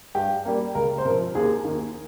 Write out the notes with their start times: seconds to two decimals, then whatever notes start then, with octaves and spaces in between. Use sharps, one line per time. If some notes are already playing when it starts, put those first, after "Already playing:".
0.15 G2 G4
0.45 G3 A#3
0.75 C#2 A#4
0.98 C5
1.05 C3 A#4
1.10 F3
1.35 D#2 G#4
1.65 D#3 A#3